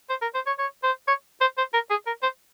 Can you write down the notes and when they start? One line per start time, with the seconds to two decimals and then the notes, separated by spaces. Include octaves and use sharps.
0.10 C5
0.22 A#4
0.35 C5
0.47 C#5
0.59 C#5
0.83 C5
1.08 C#5
1.41 C5
1.57 C5
1.73 A#4
1.90 G#4
2.06 A#4
2.23 C5